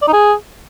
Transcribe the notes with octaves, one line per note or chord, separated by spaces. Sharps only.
D5
D#4
G#4